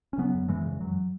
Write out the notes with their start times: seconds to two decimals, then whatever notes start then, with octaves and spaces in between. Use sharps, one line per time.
0.13 C#4
0.18 C#3 F#3 B3
0.34 F#2
0.49 F#2 E3 G#3
0.65 C#3
0.80 F#2 F#3